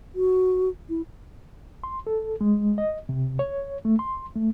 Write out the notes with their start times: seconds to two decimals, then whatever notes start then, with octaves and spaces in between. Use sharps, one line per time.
0.15 F#4
0.89 E4
1.84 C6
2.07 A4
2.41 G#3
2.78 D#5
3.09 C3
3.39 C#5
3.85 A3
3.99 C6
4.35 A3